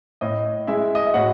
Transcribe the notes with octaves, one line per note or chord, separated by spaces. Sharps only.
A2 D#5
G#3 E4 E5
D#5
E5
A2 F#4 F#5